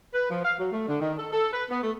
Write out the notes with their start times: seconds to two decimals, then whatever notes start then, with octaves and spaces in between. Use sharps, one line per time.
0.14 B4
0.31 F3
0.45 F5
0.59 F#3
0.73 A3
0.88 D3
1.01 D#3
1.19 A4
1.32 A4
1.53 B4
1.70 B3
1.83 A3